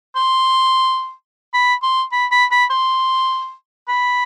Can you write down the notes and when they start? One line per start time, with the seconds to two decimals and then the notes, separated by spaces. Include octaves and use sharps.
0.16 C6
1.54 B5
1.82 C6
2.12 B5
2.31 B5
2.51 B5
2.70 C6
3.88 B5